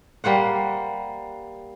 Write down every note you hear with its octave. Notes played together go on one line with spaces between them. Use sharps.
G3 A#3 C5 F#5